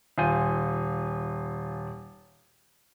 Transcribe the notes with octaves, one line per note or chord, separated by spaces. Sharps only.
D#1 F4 G#5 G6 D#7